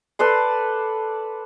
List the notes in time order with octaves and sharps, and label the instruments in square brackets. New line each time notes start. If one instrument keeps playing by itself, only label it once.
[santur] A4 B4 D5 C6